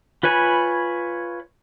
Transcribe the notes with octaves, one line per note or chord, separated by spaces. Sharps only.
F4 B4 C#5 G#5 B5